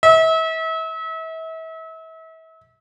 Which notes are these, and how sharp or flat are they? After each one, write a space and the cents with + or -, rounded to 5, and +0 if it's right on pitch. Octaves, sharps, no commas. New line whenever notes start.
E5 -35